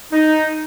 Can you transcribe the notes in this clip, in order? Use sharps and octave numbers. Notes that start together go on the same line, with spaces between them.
D#4